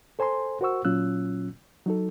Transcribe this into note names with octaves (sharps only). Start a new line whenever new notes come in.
A4 C5 G#5 A#5 C6
F#4 A#4 C5 F#5 C#6 E6
A#2 F#3 C#4 F4 E6 F#6
F#3 D#4 A4